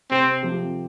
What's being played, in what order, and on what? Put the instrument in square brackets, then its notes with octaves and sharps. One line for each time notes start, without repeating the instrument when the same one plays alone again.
[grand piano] C3 [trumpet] C4
[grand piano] F3 C4 G4